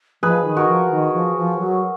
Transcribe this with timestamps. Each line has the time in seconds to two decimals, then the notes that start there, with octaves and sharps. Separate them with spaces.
0.23 F3 G#4 B4
0.45 D#3
0.57 F#4 A#4
0.69 F3
0.91 D#3
1.14 F3
1.37 F3
1.59 F#3